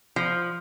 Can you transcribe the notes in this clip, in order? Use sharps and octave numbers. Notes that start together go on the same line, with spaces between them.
F3